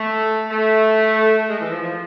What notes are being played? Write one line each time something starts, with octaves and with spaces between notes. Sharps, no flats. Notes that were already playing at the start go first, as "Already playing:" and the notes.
Already playing: A3
A3
G#3
E3
F3
F3